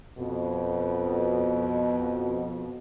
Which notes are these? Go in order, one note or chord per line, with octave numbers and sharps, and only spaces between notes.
F2 B2